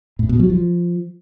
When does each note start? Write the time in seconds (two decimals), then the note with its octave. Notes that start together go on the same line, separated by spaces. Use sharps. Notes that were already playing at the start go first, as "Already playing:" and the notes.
0.19 A2
0.29 B2
0.40 F#3
0.50 F3